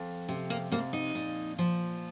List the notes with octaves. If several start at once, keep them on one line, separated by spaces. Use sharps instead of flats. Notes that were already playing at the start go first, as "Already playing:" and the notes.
Already playing: F2
C3
A#3
F2 A#3
D#4
A#2
F3